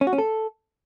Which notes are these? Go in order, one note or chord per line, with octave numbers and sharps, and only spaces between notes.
C#4
F#4
C#4
A4